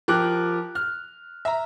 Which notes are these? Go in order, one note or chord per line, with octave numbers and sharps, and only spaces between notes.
F3 G4 A#4 D6 F#6
F6
E5 A#5